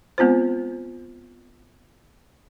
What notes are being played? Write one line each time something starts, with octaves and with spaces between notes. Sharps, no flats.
G#3 B3 C4 F4 C5